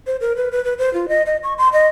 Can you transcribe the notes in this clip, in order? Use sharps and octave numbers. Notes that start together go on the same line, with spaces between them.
C5
A#4
B4
B4
B4
C5
F4
D#5
D#5
C#6
C6
D#5